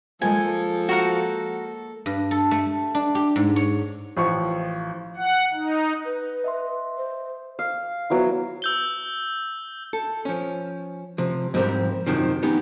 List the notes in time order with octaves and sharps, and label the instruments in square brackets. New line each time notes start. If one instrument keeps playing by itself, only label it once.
[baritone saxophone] F3 [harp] G#3 A#3 C#7 [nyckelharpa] A4 [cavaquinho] G#5
[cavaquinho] F#4 A#4 F#5
[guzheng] G2
A4
A3
D4
G4
G#2
C#5
[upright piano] A1 F3 C#6
[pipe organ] F#5
D#4
[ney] B4
[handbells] D#5 E5 C6
[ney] C5
[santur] F5
F#3 B3 E4
[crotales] E6 G6 G7
[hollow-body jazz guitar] A4
F3 C#4
C3 F3
G#2 F3 G3 C4 G4 A#4
F#2 C3 D#3 F3
B3 C#4 D#4 G4